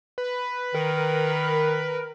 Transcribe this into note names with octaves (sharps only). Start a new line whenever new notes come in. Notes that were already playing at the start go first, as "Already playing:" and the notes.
B4
D#3 A#4